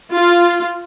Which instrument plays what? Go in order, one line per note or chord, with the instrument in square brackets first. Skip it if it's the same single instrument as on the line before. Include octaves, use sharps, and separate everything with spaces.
[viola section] F4